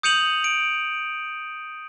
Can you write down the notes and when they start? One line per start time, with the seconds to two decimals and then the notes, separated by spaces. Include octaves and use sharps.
0.03 D#6 G6 C#7 D#7 F7 F#7
0.44 D7